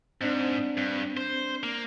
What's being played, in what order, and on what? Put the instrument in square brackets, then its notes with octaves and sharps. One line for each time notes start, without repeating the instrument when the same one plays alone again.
[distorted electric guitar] G#2 [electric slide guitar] C4 D4
[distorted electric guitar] G2
C5
A#3